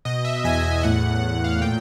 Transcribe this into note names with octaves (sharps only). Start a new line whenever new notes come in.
B2 D#5
E5
E2 G#5
A2 F#5
A2
F5
F#5
A#2 G5